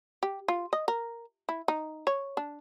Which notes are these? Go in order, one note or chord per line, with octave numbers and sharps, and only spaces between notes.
G4
F4
D#5
A#4
E4
D#4
C#5
D4